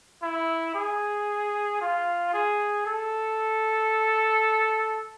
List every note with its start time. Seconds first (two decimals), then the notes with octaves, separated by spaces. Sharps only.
0.23 E4
0.75 G#4
1.81 F4
2.34 G#4
2.86 A4